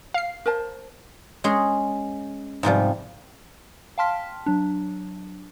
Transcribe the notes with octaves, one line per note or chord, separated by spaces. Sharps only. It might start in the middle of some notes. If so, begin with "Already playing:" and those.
F5 C7
A#4 C5 A5
G#3 C#4 G#4 C6
G#2 C3 F3 G3
F5 G5 A5 C6 F6 B6
F#3 D4